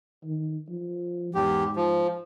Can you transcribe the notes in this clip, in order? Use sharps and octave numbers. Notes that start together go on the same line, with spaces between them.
D#3
F3
E2 G#2 G4
F3